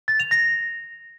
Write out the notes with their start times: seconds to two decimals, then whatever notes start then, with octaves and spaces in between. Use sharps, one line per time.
0.08 A6
0.20 F7
0.31 A#6